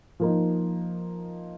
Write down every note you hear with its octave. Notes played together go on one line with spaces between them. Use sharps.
F3 A#3 D#4